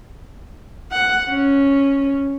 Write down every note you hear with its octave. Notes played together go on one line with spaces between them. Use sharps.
F#5
C#4